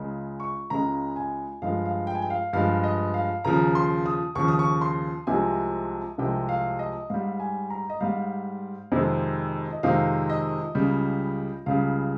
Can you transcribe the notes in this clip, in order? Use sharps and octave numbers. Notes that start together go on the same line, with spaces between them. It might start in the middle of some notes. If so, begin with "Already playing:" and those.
Already playing: C#2 C#3 G#3
C#6
C#2 C#3 G#3 A#5
G#5
G2 F3 G#3 F5
F5
G5
G#5
G5
F5
G2 F3 G#3 F5
D#5
F5
D#2 C#3 F3 A#5
C6
D#6
D#2 C#3 F3 C#6
D#6
C#6
C6
C2 C3 F3 G#3 G#5
C2 C3 F3 G#3 G5
F5
D#5
G#2 G3 F5
G#5
A#5
D#5
G#2 G3 F5
F2 C3 D#3 G#3
D#5
F2 C3 D#3 G#3 F5
D#5
C#2 C#3 G3
C#2 C#3 G3 F5